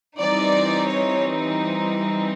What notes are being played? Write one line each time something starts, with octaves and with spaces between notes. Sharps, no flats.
E3 G3 C4 D#4 D5
C#5